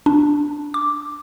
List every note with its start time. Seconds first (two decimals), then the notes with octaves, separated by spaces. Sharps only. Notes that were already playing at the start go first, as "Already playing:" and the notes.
0.06 D4
0.74 D6